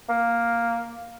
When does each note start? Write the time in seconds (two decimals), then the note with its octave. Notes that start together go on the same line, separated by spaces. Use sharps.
0.09 A#3